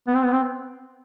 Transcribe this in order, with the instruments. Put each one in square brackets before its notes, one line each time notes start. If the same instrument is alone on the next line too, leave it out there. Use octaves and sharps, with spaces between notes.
[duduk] B3
C4
B3
C4